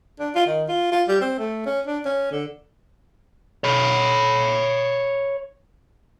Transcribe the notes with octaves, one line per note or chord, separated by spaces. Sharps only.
D4
F4
D#3
F4
F4
G3
C4
A3
C#4
D4
C#4
D3
C#5 B5